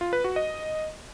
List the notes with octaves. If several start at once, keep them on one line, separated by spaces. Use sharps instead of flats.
F4
B4
F#4
D#5